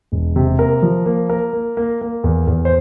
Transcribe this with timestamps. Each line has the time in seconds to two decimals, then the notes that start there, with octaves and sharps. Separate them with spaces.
0.12 E1
0.36 C3
0.59 A#3 A#4
0.82 F3
1.06 A#3
1.29 A#3 A#4
1.53 A#3
1.77 A#3
2.01 A#3
2.24 E2
2.47 E2
2.65 C5